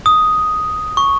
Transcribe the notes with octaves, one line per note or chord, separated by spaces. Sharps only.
D#6
C#6